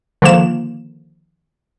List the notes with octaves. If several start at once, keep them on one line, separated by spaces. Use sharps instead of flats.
D3 D#3 F3 A#3 E7